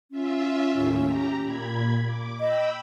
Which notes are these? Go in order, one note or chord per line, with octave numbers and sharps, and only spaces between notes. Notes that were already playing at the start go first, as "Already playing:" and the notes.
C#4 F4 E5
D#2 A2
G4 A#5
A#2 B5 G#6
D6
D#5 G5 B5 E6